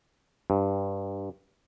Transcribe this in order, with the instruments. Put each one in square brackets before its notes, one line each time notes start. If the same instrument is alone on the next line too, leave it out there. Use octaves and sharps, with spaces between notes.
[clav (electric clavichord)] G2